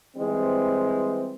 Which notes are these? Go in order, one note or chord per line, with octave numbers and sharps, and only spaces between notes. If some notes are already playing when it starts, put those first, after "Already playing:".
E3 G3 G#3 C4